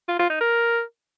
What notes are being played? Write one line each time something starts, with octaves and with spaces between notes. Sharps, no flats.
F4
F4
D#4
A#4